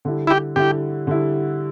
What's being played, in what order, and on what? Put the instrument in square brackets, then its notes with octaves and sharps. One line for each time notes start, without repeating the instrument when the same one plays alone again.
[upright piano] D3 G3 E4
[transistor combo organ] E4
G4
[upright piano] D3 G3 E4 [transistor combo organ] G4
[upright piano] D3 G3 E4